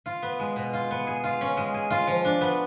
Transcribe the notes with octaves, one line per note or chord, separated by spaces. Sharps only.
F4
B3
G#3
B2
F4
B3
G#4
F4
C#4
G#3
G#4
F4
F3
D4
B3